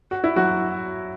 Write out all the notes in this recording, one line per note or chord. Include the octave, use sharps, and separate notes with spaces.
F#4
E4
F#3 F#4